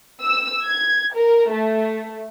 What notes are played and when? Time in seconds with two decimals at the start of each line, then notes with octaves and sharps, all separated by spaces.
0.22 E6
0.65 G#6
1.15 A#4
1.53 A3